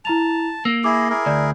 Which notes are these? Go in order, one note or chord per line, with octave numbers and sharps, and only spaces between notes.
E4 A5 A#5 F7
A#3 E6
E4 G#4 D6
E4 G#4 A#4
D2 D5